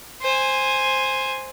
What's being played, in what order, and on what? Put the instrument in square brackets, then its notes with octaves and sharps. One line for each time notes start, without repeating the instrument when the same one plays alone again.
[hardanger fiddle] C5 G#5